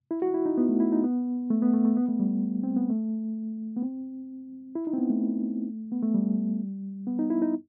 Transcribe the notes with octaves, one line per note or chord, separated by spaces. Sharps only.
E4
F#4
E4
D#4
B3
A3
E4
D#4
B3
A3
B3
A3
A3
B3
A3
G3
C4
B3
A3
B3
C4
E4
D#4
C4
B3
A3
B3
A3
G3
B3
D#4
E4
D#4